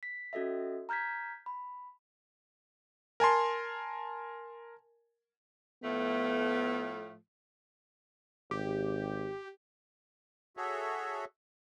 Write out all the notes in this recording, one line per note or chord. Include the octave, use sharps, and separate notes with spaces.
B6
C#4 F#4 A4 D#5 E5
A#5 F6 G6 G#6 B6
B5
A#4 G#5 A5 C6
A2 F3 A3 B3
G#1 G4
F#4 G#4 A4 C#5 E5